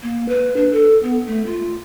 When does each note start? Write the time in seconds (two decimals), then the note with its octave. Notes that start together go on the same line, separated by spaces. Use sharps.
0.02 A#3
0.28 B4
0.56 D4
0.71 A4
1.03 B3
1.26 A3
1.46 F4